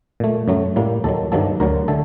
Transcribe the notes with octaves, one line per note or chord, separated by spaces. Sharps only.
A#2 A3
F#2 F#3 A3
A2 G3 A#3
D#2 D#3 F#3 A4
G2 D#3 F#3 A#3 A4
D2 D3 F#3 A#4
D3 A3 A4